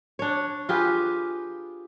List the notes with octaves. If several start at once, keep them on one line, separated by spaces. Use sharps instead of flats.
D4 C#5
F4 G4 G#4 B4